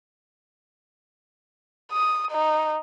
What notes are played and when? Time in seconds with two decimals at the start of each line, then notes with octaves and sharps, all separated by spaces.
1.92 D#6
2.31 D#4